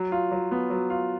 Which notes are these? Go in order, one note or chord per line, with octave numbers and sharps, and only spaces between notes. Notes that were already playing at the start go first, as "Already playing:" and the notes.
Already playing: F#3
F4
F#3
B3
F#3
F4